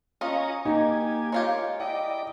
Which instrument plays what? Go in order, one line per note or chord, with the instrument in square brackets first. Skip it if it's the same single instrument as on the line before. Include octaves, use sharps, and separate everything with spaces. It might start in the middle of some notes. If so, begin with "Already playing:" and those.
[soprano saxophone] C#4 [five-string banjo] F4 D#5 [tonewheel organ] A#5 C#6 D#6
[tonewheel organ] A#3 G#5 [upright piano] D#4 [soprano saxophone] G4
[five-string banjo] G#3 F4 G4 [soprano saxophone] C#5
[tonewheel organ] E4 D5 D#5 [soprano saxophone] G5